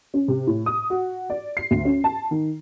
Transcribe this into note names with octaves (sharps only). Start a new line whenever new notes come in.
C#4
C3
A2
D#6
F#4
D5
C7
D2
C#4
A5
D#3